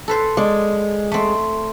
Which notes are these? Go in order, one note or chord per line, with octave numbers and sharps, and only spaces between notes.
A4 B4 C5
G#3 D5
A3 C4